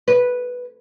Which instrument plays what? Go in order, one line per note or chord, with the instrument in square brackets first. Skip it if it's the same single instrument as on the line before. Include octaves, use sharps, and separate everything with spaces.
[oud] B4